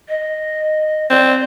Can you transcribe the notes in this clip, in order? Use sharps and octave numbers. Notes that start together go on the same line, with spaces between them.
D#5
C4 D5